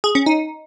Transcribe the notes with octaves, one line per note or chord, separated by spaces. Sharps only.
G#4
C#4
D#4